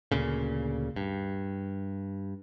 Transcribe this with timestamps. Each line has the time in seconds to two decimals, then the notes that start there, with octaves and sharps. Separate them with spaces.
0.11 D2 A#2 C#3
0.96 G2